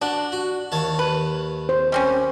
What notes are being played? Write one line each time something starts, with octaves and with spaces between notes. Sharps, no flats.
D4 F#4
F#4
D#2 C#5 A5
B4
C5
G3 C4 C#4